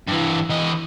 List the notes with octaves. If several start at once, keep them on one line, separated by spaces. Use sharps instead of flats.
G2 E3
E3 D#5